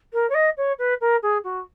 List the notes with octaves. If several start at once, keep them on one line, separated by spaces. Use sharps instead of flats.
A#4
C#5
D#5
C#5
B4
A#4
G#4
F#4